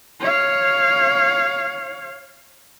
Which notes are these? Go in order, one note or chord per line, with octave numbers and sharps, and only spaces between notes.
C#5 F5